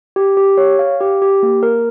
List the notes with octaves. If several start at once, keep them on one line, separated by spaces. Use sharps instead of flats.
G4
G4
C#5
F5
G4
G4
A#3
A#4